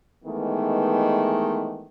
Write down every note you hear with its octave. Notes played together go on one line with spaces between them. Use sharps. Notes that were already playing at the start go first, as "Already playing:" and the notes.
D#3 E3 G#3 A3 B3